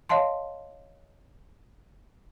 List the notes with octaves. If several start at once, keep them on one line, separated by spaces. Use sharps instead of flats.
C#5 D#5 F5 A5 C6